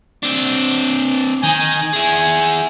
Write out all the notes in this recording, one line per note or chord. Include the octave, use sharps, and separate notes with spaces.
C4 D4
D#3 G#5
E4 G#4